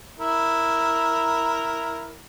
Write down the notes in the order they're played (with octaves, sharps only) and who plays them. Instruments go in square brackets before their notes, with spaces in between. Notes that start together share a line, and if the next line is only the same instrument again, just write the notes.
[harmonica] E4 A#4